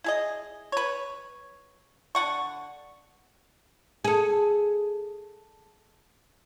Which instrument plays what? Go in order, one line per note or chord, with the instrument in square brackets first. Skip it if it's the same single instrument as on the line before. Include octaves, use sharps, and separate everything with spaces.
[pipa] E4 G#4 D#5
B4 C#5
D3 F#5 C#6
[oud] G#4 A4